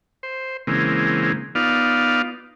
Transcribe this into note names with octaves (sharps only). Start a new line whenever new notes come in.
C5
C#3 E3 G#3 A#3 C4
B3 D#4 F4 D5 F5